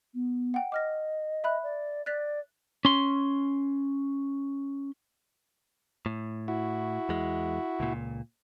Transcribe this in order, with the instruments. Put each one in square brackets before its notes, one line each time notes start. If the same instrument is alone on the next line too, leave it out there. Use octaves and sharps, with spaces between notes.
[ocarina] B3
[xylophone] F#5 G5
[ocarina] D#5 [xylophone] D6 F6 A#6
[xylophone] E5 B5 F#6
[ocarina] D5
[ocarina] D5 [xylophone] F#6 A6 B6
[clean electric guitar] C#4 C6
A2
[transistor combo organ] E4 F#4
[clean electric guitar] E2 G#3
C#2 A#2